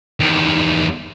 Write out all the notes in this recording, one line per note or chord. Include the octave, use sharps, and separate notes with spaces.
E2 D#3